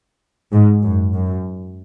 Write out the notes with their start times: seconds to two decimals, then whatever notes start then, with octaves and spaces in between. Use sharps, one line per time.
0.52 G#2
0.82 F#2
1.13 F#2